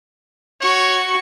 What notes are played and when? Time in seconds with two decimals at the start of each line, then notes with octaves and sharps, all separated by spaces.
0.61 F#4 C#5 C#6